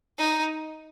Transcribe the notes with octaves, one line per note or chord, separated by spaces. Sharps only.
D#4